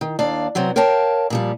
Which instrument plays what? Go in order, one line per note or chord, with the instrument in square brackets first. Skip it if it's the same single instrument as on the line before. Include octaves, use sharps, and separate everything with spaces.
[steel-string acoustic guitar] D#3
D#2 D4 D5 F5
C3 F#3 B3 C4
A#4 C#5 F5 G5 A5
A#2 F3 G3